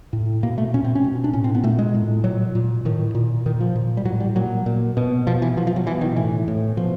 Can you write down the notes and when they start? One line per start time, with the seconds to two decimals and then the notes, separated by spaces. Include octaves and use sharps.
0.13 A2
0.43 B2 A#3
0.58 A3
0.74 A#2 C#4
0.84 C4
0.95 C#4
1.04 B2
1.24 D4
1.33 A2 C#4
1.44 C4
1.55 B3
1.63 A#2 A3
1.79 G#3
1.94 A2
2.24 A#2 F#3
2.55 A#2
2.85 A2 D#3
3.15 A#2
3.46 A#2 D#3
3.61 F3
3.75 A#2
3.97 G3
4.05 A2 F#3
4.20 G3
4.36 A#2 F#3
4.66 A#2
4.97 B2
5.27 B2 F3
5.42 E3
5.57 B2 F3
5.67 F3
5.76 F#3
5.87 B2 E3
6.01 D#3
6.16 A2 E3
6.48 A2
6.77 B2 F3